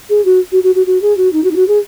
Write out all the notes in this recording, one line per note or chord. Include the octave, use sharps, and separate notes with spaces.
G#4
F#4
F#4
F#4
F#4
F#4
G#4
F#4
D#4
F#4
D#4
F#4
G#4